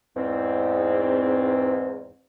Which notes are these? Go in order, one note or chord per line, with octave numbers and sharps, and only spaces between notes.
E2 G#2 C4